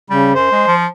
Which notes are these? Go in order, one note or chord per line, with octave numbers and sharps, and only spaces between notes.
C#3 G3
F#2 C5
G#3
F3